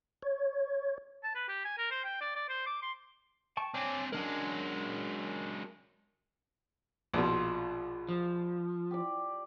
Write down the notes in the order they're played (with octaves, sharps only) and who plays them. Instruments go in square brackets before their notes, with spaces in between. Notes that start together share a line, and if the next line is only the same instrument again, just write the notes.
[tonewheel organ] C#5
[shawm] A5
B4
G4
G#5
A#4
C5
G5
D5
D5
C5
D6
C6
[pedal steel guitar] G5 A5 C#6
[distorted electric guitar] C4 D4 [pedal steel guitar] C#5 G#5 D6
[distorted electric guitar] F#3 G#3 [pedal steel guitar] C#4 D4 A#4
[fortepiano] A#1 B2 [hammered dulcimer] F4
[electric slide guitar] F3
[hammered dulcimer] G4 D5